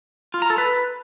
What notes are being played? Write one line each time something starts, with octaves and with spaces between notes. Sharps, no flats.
F4
A#5
A4
B4